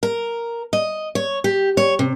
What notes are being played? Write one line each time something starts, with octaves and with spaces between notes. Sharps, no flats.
A#4
D#5
C#5
G4
C#5
C3